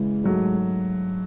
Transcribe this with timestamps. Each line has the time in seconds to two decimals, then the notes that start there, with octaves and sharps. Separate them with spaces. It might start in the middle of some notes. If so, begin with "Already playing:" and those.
Already playing: C#3 E3 G#3
0.24 G#2 F#3 A3